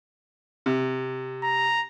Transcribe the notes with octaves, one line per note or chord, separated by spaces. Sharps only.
C3
A#5